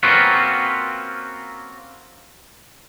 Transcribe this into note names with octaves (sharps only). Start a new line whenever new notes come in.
A#3 C4 C#4 F4 F#4 B4